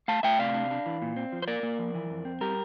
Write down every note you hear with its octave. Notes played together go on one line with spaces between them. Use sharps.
A3 F5 A5
A3 E5 G5
C3 D5 F5
D4
D4
E3
A#2
C4
F3
C5
A#3 A#4 D5
A#3
F3
E3
F2
C4
G3 G4 A#4